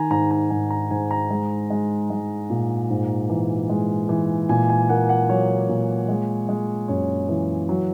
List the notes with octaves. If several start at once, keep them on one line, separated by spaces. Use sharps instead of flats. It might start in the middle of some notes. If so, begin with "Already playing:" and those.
Already playing: D#3 G#5 A#5
G#2 A#5
A#5
G#2 G#5
A#5
G#2 G#5
A#5
G#3
G#3
G#3
A#2
G#2
E3
G#3
E3
A#2 G#5
G#5
A#3 F#5
F#5
F#3 C#5
A#2
G#3
G#3
F#2 C#5
E3
F#3